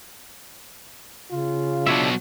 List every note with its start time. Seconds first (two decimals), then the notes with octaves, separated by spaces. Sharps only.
1.31 C#3 F4
1.87 B2 F#3 D4 C#5 E5